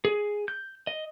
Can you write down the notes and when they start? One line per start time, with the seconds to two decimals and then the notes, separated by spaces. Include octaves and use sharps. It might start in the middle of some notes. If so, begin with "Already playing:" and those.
0.05 G#4
0.48 G6
0.87 D#5